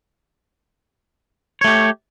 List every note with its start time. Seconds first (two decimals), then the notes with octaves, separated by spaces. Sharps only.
1.61 C#5
1.64 A3
1.67 G4